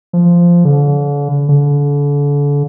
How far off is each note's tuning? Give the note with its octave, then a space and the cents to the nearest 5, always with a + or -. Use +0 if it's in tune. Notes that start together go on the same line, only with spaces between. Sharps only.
F3 -10
D3 -40
D3 -35